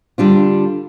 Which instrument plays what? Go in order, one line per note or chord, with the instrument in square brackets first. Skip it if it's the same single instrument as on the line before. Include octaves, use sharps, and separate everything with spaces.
[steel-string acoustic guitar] D3 G3 D4 F4